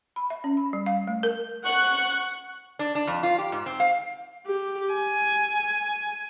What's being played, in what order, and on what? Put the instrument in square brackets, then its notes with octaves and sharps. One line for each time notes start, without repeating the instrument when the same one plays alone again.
[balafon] B5
E5
C#4
B5
G3
F5
A3
A#4
[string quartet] F#5 C#6 F#6
[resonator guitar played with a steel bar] D4
D4
F2
F4
G4
G#2
C4
F5
[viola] G4
G#5